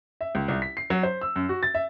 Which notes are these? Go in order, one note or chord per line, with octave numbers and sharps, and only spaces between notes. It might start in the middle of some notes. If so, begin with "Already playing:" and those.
E5
C#2
C2
B6
C7
F#3
C5
E6
F#2
F#4
A6
E5